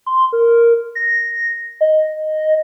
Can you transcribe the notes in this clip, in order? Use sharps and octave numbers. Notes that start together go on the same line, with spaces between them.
C6
A#4
A#6
D#5